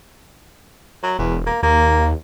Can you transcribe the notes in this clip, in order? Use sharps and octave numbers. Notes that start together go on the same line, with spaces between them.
F#3
E1 E2
A#3
D#2 A#3